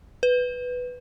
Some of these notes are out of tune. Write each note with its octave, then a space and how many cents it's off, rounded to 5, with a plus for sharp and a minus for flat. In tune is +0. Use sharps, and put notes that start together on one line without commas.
B4 +5